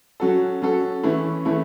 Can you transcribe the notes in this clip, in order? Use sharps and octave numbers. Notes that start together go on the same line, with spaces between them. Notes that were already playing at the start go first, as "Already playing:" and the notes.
F#3 C#4 F#4 A4
F#3 C#4 F#4 A4
E3 A3 C#4 E4
E3 A3 C#4 E4